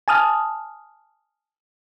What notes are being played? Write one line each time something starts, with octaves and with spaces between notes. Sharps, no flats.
G#5 A5 D#6 F6